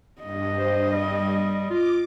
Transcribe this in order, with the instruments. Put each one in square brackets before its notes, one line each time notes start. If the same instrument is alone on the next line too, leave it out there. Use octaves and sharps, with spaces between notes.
[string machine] G2 [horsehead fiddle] D#5
[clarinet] C5
G3
[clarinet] F4 [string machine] D6